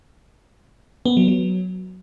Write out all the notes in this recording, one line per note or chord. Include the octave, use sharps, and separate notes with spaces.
B3
F#3
F#3